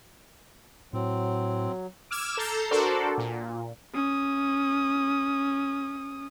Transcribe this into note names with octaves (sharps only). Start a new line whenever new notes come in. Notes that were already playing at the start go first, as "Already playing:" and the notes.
A2 F#3 C4
D6 E6 F6 G#6 E7
A4 A#5 G6 A6 C7
D4 F#4 A4 A#4 C5 D5
A#2
C#4 D#6